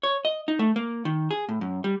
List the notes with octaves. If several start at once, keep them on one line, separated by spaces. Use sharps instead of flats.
C#5
D#5
D#4
A3
A#3
D#3
G#4
A2
F#2
G3